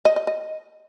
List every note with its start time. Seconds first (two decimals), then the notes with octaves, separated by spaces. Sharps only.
0.05 D#5
0.16 D#5
0.27 D#5